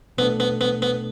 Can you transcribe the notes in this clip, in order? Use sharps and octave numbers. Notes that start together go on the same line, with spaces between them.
B2 A3 B3 D4 A4
B3
B3
B3